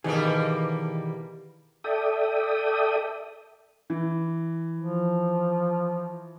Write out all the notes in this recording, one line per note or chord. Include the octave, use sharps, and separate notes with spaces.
B2 D#3 E3 G3 A#3 G#4
A4 D5 E5 G5 D#6
E3
F3